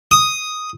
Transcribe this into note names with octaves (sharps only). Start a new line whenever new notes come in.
D#6